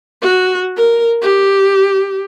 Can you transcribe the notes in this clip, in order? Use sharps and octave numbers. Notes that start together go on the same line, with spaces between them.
F#4
A#4
G4